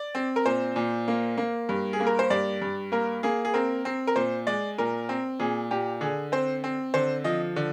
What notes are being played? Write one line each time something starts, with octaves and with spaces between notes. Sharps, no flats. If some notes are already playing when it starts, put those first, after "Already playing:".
Already playing: D5
C4
A#4
A#2 C5
A#2
A#3
A#3
G2
G#4
A#3
A#4
C5
G2 D5
G2
A#3 A#4
A#3 G#4
G#4
C4 A#4
C4
A#4
A#2 C5
G#3 D5
A#2 A#4
C4
A#2 G#4
A#2 G4
D3 G#4
C4 C5
C4
D3 C5
F3 D#5
D3